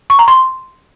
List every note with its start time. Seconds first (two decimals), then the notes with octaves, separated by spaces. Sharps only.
0.10 C#6
0.19 A#5
0.28 C6